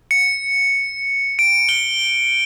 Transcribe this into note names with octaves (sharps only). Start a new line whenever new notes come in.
C#7
D7
G7